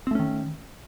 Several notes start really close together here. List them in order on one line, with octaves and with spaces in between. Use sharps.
C4 A3 C#4 D#3